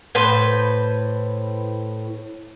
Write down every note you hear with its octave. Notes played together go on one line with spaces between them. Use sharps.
A2 B4 C5